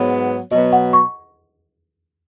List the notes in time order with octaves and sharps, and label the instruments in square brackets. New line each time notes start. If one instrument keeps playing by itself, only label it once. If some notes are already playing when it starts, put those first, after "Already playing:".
Already playing: [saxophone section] G#2 F#3 B3 [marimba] C#5
[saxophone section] B2 F#3 B3 [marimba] D#5
[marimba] F#5
C#6